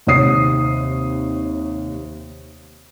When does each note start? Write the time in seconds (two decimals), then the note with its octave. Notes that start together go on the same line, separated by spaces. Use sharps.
0.07 D#2 C3 C#5 D#6 C7